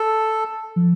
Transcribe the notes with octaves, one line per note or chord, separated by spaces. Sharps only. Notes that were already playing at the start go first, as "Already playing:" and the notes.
Already playing: A4
F3